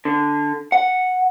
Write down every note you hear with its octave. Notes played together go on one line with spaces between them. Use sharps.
D3
F#5